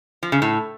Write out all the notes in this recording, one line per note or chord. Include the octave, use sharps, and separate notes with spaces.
F3
C#3
A2